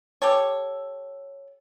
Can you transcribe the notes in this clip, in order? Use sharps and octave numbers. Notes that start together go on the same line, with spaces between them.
G4 A4 C#5